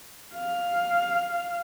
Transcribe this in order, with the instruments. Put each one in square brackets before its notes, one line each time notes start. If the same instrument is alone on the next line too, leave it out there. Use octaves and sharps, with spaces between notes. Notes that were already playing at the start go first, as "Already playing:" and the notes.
[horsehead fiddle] F5